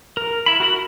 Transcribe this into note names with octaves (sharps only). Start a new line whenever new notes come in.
A#4
E4 B5
F#4 A#4 B5